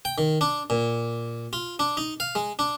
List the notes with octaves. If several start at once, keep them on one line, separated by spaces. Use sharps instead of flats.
G5
D#3
D4
A#2
F4
D4
D#4
F5
G#3
D4